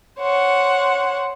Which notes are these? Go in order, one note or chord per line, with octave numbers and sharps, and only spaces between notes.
C5 C#5 F#5